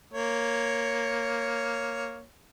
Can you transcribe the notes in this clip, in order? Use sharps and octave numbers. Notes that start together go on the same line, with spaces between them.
A#3 C#5